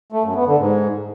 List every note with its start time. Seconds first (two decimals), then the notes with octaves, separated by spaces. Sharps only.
0.12 A3
0.24 F#2
0.35 B3
0.46 D3
0.58 G#2